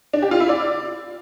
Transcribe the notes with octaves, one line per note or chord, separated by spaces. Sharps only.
D4
G4
F4
E4
D5